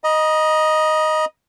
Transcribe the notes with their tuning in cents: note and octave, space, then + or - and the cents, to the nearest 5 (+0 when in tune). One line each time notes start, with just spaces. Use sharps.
D#5 +0 A#5 +45